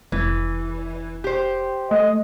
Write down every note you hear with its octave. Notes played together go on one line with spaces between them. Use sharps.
F1 E3
G4 C5
A3 D#5